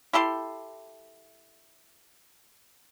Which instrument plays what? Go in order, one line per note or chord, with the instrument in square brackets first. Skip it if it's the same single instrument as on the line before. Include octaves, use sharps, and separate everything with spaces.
[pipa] E4 G4 A4 C6